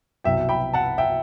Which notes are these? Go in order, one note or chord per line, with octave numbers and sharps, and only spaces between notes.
C2 B2 F#3 E5 G5
G5 B5
F#5 A5
E5 G5